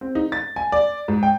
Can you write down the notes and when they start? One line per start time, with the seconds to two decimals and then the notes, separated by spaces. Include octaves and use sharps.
0.01 C4
0.15 D#4
0.32 A6
0.56 G#5
0.72 D5
1.08 G#2
1.23 G5